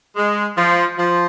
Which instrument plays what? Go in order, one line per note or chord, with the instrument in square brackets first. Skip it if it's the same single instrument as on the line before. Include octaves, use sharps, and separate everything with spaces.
[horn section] G#3
F3
F3